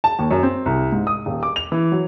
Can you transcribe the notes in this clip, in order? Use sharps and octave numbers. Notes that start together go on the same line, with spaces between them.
A5
D#2
F#2
C4
C2
G#2
D#6
D#1
D6
F7
E3
F#3